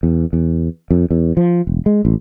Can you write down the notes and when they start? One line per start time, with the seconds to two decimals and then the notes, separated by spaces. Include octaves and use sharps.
0.03 E2
0.33 E2
0.91 F2
1.11 E2
1.37 F3
1.67 E1
1.86 G#3
2.05 A1